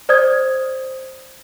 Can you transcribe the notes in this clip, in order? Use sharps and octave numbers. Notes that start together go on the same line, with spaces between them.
C5 D5 D#6 G#6